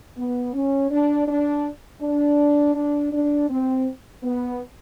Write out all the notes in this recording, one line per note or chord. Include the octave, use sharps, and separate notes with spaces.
B3
C#4
D4
D4
D4
D4
D4
C4
B3